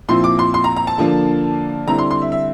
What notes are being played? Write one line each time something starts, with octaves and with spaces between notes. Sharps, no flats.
A#2 F3 C4 E4 C6
D6
C6
C6
A#5
A#5
A5
D3 F3 A#3 D4
D3 G3 C4 E4 A#5
C6
C6
E5
E5